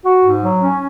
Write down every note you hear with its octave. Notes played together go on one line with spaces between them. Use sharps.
F#4
G#2
F#3
C#4